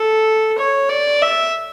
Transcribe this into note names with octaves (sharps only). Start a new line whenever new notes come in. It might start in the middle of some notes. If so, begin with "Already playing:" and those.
Already playing: A4
C#5
D5
E5